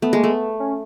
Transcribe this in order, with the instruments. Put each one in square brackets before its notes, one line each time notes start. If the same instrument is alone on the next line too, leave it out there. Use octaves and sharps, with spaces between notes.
[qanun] A3 [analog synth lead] B3
[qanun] G#3 [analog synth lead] A#3
[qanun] A3
[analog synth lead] B3
C#4